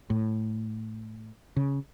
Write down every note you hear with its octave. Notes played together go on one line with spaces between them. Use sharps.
A2
C#3